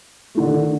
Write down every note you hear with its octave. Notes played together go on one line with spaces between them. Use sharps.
D3 D#3 A3